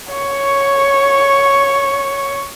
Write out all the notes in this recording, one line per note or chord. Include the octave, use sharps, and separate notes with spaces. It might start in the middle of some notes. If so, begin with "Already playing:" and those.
C#5 C#6